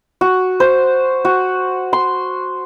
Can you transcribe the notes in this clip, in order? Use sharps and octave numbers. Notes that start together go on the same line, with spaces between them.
F#4
C5
F#4
C6